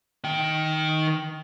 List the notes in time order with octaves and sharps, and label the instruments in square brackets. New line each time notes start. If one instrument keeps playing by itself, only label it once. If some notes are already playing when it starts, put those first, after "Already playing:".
[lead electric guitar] D#3 G5